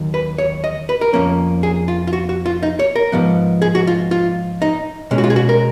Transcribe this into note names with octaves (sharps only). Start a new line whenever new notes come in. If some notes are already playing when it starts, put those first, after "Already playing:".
Already playing: D#2 D#3 F#3
B4
C#5
D#5
B4
A#4
F2 F3 A#3 C#4
G#4
F4
F4
F#4
F#4
F4
D#4
C#5
A#4
G#2 F3 B3
G#4
F#4
F4
F4
D#4
B2 G#3 C#4
F#4
F4
G#4
F#4
A#4